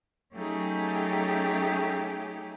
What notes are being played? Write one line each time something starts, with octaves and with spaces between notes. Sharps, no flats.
F#3 A3 C#4 D#4 G4 G#4